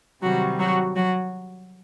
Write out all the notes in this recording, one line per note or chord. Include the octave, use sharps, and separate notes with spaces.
C3 D#3 F#3 G3 F#4
F#3 F#4
F#3 F#4